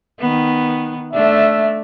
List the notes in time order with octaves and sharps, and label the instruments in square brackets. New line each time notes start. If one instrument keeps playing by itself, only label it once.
[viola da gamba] D#3 B3
[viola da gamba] A3 D4 [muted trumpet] E5